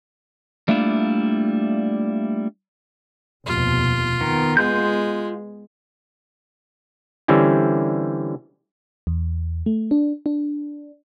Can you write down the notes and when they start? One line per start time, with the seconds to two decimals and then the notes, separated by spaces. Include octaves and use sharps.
0.68 G3 A3 A#3 D4 E4 F4
3.46 F1 D#2 B2 F4
4.21 D#3 B3
4.57 G#3 F4 C6 G6
7.28 D3 E3 G3 C4 C#4 E4
9.07 E2
9.66 A3
9.91 D4
10.26 D4